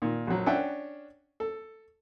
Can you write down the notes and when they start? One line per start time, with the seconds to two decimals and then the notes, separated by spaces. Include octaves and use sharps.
0.02 A#2 D#3
0.27 A#1 F#3
0.46 C#4 D4 E5 F#5 G5
1.40 A4